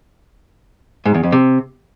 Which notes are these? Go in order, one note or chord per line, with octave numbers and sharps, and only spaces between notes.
G#2
E2
F2
C3